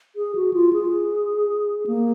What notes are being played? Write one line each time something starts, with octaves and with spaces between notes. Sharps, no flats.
G#4
F#4
F4
G#4
A#3